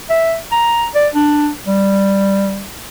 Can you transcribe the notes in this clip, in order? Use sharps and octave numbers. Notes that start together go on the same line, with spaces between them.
E5
A#5
D5
D4
G3